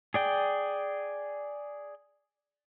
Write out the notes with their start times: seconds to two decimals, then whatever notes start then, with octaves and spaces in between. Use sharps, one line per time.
0.14 G#4 D5 G5